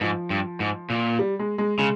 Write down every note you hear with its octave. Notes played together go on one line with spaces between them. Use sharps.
G#2 F3
G2
G#2
A#2
G3
G#3
G#3
C#3 G#3